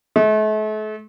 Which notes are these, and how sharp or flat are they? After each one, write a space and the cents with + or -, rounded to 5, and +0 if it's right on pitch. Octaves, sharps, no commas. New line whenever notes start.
A3 -40